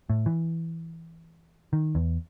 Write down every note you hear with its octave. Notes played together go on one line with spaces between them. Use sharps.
A2
E3
D#3
E2